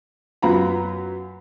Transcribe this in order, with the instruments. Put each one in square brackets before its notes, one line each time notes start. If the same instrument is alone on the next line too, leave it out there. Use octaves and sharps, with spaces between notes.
[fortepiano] F#2 B3 F4 A#5 B5